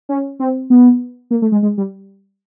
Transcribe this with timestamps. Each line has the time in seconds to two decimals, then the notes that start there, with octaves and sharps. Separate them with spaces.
0.09 C#4
0.40 C4
0.70 B3
1.31 A#3
1.42 A3
1.52 G#3
1.62 G#3
1.78 G3